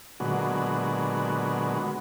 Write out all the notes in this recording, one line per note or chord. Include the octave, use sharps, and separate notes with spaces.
A#2 D3 F#3 G#3 B3 F#4